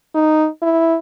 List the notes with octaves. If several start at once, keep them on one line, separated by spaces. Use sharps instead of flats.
D#4
E4